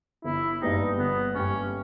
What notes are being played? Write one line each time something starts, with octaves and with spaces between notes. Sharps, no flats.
G1 E4
G2 G3 B3 D#4 G4
G1 B3
G2 G3 B3 C#4 G4